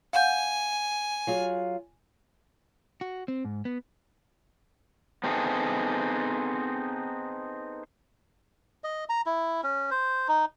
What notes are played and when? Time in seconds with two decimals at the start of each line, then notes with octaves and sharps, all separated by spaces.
0.13 F5 F#5 G#5 G6
1.27 F#3 F4 G#4
3.01 F#4
3.28 C4
3.45 G#2
3.65 B3
5.24 B3 C4 D#4 G#4 A4
8.84 D#5
9.09 A#5
9.26 E4
9.63 C#4
9.91 C5
10.28 D#4